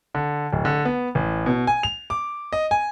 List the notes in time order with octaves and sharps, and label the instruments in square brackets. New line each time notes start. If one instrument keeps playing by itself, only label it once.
[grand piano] D3
D1
D3
B3
A1
B2
G#5
F7
D6
D#5
G#5